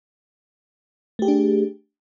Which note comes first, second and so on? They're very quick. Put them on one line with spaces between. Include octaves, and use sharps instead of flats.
A3 G4 G#4 D4